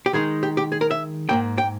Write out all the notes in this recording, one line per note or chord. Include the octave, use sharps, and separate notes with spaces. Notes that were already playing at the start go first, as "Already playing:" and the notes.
G4
D#3 G#3 D#4 G#4
G4
G4
G#4
A#4
E5
G#2 D#3 A#3 G5
G5